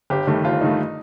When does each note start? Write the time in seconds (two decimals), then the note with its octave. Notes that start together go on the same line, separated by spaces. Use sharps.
0.10 G1 G4
0.27 G2 D#3 A3
0.44 G1 F4
0.61 G2 D#3 A3 D#4